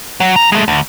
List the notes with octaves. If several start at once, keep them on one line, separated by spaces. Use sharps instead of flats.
F#3 F#4
F2 A#5
G#3 A3
D2